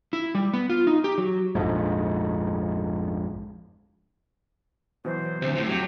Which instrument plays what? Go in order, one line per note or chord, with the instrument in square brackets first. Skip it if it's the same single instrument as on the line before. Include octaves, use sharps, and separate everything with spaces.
[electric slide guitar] E4
G3
B3
F4
D#4
G4
F#3
[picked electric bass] A#1 F2 G#2
[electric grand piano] B2 E3 F#3 [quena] C5
[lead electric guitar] D2 [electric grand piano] C3
[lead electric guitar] B1 A2
[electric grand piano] F2 [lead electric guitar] F#3 [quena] G4